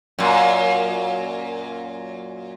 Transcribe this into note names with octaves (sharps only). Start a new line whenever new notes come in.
F#2 A#2